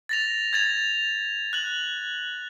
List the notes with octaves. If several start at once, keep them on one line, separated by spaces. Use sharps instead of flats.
A6 A#6 F7
G#6 A6 F7
F#6 F#7